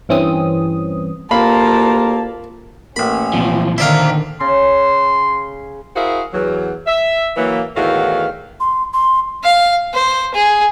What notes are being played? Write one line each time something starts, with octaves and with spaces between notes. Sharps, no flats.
G2 E3 C4 C#4 D#6
D2 C3 A#3 F4 A#4 F5 A5 B5
A1 A#3 C#4 B5
C2 A#2 E3 F3
D3 D#3 D4 E4 C5 D5 F5 A#5
C#3 C6
E4 F#4 G#4 A#4 C5 F5
E2 F#3
E5
E3 F#3 A#3
E2 A2 D#3 F#4 F5
C6
C6
F5
C5
G#4